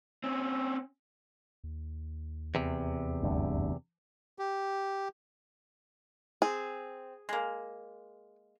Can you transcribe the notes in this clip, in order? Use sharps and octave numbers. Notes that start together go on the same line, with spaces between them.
C4 C#4
D#2
E2 C3
F#1 D2 G2
G4
C4 G#4
G#3 A#3